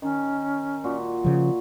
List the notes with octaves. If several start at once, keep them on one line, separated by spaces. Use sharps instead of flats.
D#3 C#4
A#2 F#4
C#3 F3